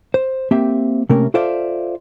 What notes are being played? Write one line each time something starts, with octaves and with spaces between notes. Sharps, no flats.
C5
A#3 C4 G4 E5
C3 A3 A#3 C#4 A#4
F4 A4 C5 D5 E5 F5